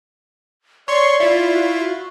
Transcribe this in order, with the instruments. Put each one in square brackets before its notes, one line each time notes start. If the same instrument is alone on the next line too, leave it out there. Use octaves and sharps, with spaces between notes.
[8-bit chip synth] C#5 C6 C#6 [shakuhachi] D5
[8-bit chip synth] E4 F4
[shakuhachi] F#4
F#4